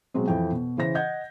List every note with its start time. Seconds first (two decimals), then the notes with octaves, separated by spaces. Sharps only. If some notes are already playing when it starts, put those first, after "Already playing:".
0.14 B2 F#3 G#3 C4
0.28 F2 E3 G5
0.51 B2
0.77 C#3 E3 C5 A#6
0.95 D#5 F#5 G6 G#6